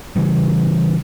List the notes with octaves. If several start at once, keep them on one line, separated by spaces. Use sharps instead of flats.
C#3 E3 G3